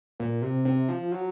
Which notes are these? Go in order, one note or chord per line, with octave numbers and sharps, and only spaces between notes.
A#2
C3
C3
F3
F#3